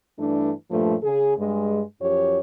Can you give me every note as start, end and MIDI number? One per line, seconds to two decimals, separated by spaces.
0.19 0.52 43
0.19 0.52 52
0.19 0.52 57
0.19 0.52 62
0.71 0.94 43
0.71 0.94 46
0.71 0.94 53
0.71 0.94 57
1.02 1.37 49
1.02 1.37 68
1.38 1.81 43
1.38 1.81 56
2.01 2.39 42
2.01 2.39 53
2.01 2.39 67
2.01 2.39 73